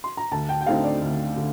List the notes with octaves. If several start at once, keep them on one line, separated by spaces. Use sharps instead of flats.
C6
A#5
D2 A5
G5
G5
D3 A3 C4 D#4 F5
D5
D2
D3